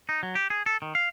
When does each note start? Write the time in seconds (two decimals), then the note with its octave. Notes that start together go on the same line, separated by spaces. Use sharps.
0.09 D#4
0.23 F#3
0.35 G4
0.50 G#4
0.66 A4
0.82 D#3
0.95 F5